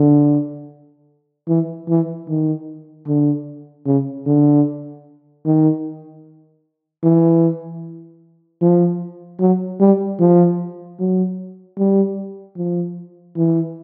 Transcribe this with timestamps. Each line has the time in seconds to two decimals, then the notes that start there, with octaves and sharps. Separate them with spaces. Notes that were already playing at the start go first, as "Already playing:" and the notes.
Already playing: D3
1.49 E3
1.89 E3
2.29 D#3
3.07 D3
3.86 C#3
4.26 D3
5.45 D#3
7.03 E3
8.61 F3
9.40 F#3
9.80 G3
10.20 F3
10.99 F#3
11.78 G3
12.57 F3
13.37 E3